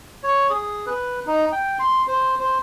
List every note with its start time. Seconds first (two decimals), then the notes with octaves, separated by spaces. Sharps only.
0.24 C#5
0.50 G#4
0.87 B4
1.27 D#4
1.52 G5
1.79 C6
2.08 C5
2.40 C5